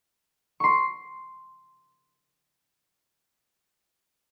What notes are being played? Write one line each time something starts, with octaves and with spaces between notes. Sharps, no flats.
C6 C#6